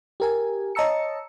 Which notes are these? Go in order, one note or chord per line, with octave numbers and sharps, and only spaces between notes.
G4 A#4 G#5
C#5 D#5 A5 A#5 E6 C#7